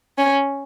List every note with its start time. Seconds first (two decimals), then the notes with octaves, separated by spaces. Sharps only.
0.18 C#4